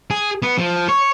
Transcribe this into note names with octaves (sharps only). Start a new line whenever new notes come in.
G#4
B3
F3
C#5